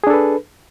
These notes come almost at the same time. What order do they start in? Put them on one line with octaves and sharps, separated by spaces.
G#4 D4 A4 B4